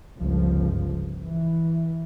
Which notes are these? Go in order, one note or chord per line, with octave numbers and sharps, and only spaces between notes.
G1 C#2 F3
E3